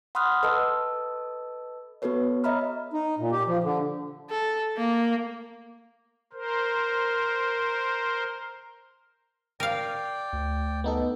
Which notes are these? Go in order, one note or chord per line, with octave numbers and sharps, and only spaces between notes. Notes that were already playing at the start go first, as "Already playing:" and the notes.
F#5 B5 C6 D#6 F6 F#6
A4 B4 D#5 A5 E6
B3 F#4 A4 B4 C#5
C#5 D#5 E5 A#5 B5 F6
D#4
A#2
G4
F3
D3
A4
A#3
A#4 C5
A#4 D5 F5 G5
D2
B3 D#4 A4